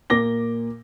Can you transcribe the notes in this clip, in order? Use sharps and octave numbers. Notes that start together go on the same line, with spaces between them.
A#2 A#3 D6 A#6 G7